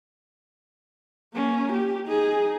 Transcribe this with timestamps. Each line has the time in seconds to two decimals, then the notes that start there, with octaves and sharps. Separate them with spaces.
1.34 A#3 C#4
1.72 G4
2.06 D#4 G#4